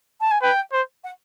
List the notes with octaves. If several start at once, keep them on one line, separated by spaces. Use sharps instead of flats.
A5
G#5
B4 G5
C5
F#5